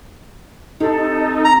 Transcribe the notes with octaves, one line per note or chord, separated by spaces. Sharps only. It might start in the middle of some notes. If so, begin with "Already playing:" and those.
C3 D#4 A4
A#5